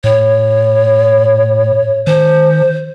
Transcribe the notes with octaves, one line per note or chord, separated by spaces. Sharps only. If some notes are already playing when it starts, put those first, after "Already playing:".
A2 C#5
D#3 C5